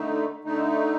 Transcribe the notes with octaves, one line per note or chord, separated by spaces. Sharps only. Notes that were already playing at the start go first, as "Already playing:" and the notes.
Already playing: D3 A3 D#4
D3 A3 D#4